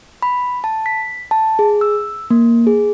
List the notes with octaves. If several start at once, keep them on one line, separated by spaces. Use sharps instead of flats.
B5
A5
B6
A5
G#4
E6
A#3
G#4